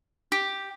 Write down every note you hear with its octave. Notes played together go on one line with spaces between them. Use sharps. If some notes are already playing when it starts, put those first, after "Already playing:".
G4